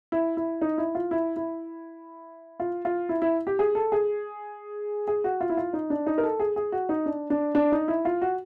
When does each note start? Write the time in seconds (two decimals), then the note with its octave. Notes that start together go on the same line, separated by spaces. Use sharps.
0.12 E4
0.37 E4
0.61 D#4
0.78 E4
0.95 F4
1.11 E4
1.36 E4
2.60 F4
2.85 F4
3.09 E4
3.22 E4
3.47 G4
3.59 G#4
3.75 A4
3.92 G#4
5.08 G#4
5.24 F#4
5.41 F4
5.50 E4
5.57 F4
5.73 D#4
5.90 D4
6.07 D#4
6.18 A#4
6.23 A4
6.40 G#4
6.56 G#4
6.72 F#4
6.89 D#4
7.06 D4
7.30 D4
7.55 D4
7.72 D#4
7.88 E4
8.05 F4
8.22 F#4